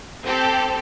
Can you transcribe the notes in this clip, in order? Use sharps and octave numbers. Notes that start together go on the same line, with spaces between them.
C4 G4 A4